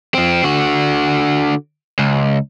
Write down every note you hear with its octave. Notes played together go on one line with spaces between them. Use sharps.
F3 C4
D3 F#4
C#2